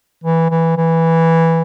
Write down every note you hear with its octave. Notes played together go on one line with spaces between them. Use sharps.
E3
E3
E3